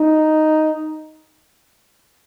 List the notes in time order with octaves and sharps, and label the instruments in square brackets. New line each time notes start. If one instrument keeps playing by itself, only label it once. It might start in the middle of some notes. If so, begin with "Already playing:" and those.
Already playing: [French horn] D#4